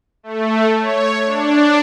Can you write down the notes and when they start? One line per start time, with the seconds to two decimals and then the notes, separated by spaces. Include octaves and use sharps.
0.23 A3
0.80 C#5
1.26 D4